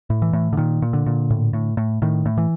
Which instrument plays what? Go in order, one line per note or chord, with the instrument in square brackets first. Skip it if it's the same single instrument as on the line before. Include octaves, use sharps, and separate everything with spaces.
[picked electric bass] A2
E3
A2
D3
A#2 D#3
A#2
D3
A#2
A2
A2
A2
A2 D#3
A2
E3